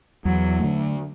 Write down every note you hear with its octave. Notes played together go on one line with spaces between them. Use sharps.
E2 F#3
D3 A3